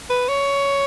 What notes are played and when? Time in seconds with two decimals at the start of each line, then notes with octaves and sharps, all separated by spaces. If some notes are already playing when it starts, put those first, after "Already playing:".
0.10 B4
0.28 C#5